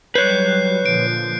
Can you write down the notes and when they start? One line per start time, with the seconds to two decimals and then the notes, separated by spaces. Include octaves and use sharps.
0.15 F#3 G3 B4 C#5 F#6 G6 C7
0.86 A#2 D3 F3 D7